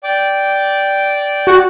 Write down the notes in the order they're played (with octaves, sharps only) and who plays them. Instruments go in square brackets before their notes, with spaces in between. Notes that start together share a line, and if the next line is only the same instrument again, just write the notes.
[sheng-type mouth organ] D5 G5 D6
[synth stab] F#4